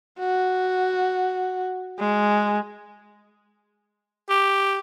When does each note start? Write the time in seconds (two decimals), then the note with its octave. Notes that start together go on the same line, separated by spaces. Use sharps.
0.19 F#4
1.99 G#3
4.30 G4